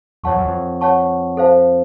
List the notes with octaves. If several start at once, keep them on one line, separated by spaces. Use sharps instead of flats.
F2 C#5 F#5 A5 C#6
F#2
F2
C#5 F#5 A5 C#6
A4 C5 F5 A5